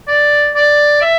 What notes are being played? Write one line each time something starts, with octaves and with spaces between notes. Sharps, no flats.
D5
D5
E5